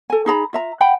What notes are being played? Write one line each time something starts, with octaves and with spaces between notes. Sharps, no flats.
A4 G#5
D#4 G#4 A#5 B5
F4 E5 A#5
F#5 G5 B5